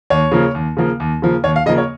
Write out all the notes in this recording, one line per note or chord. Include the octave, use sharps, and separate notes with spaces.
D#2 C#5
C#3 F3 A#3
D#2
C#3 F3 A#3
D#2
C#3 F3 A#3
D#2 C#5
F5
C#3 F3 A#3 D#5
C#5